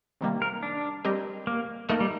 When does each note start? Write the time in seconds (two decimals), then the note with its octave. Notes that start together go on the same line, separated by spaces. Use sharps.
0.21 C3 D#3 G3 A#3
0.42 A#4
0.63 D4
1.05 G3 C4 G4 A#4 D#5
1.47 A#3
1.89 A3 A#3 D#4 A#4 D#5
2.00 G3